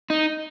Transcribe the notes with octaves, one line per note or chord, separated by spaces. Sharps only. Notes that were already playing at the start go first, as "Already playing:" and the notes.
D#4